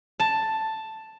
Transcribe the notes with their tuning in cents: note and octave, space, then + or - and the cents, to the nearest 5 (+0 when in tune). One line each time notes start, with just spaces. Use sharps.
A5 +5